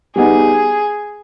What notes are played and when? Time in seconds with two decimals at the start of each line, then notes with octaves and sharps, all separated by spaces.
0.16 G3 B3 D#4 G#4